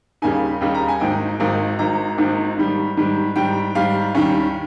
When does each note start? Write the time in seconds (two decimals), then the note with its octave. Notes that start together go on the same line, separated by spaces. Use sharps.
0.22 D#2 C#3 G3 A#3 D#4 G#5
0.61 D#2 C#3 G3 A#3 D#4
0.74 A#5
0.88 G#5
1.00 G#1 G#2 D#3 A#3 D#4 G5
1.39 G#1 G#2 D#3 A#3 D#4
1.79 G#1 G#2 D#3 A#3 D#4 A#5
2.18 G#1 G#2 D#3 A#3 D#4
2.57 G#2 D#3 G3
2.97 G#2 D#3 G3
3.35 G#2 D#3 G3 G5
3.75 G#2 D#3 G3 F5
4.15 D#2 D#3 G3 C#4